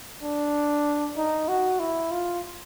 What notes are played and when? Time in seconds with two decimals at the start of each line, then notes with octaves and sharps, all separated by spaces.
0.23 D4
1.17 D#4
1.48 F#4
1.80 E4
2.12 F4